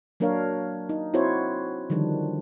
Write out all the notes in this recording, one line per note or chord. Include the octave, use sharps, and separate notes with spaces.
F#3 A#3 D4 A#4 C#5 F5
D#4
C4 E4 F#4 C5 C#5
D3 D#3 F3 G3 D4